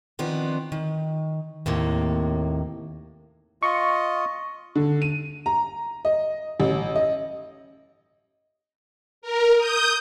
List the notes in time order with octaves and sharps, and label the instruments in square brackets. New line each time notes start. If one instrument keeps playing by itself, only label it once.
[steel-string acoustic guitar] D#3 F3 B3 C4 D4
D#3
D#2 A2 C3 A#3
[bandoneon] F4 D#5 [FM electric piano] C#6
[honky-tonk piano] D3
D#7
A#5
D#5
A1
D#5
[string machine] A#4
D#6 G6